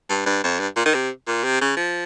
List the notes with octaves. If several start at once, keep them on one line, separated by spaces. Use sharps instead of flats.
G2
G2
F2
G2
A#2
D#3
C3
A#2
C3
C#3
F3